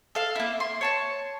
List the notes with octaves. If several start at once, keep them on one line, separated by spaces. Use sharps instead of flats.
A4 F5
A#3 E4
C6
C#5 A5 C#6